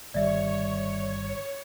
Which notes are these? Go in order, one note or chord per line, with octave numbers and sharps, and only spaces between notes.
G1 D#3 G3 C#5 D5 E5